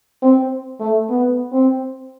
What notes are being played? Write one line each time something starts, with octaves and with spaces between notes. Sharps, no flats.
C4
A3
B3
C4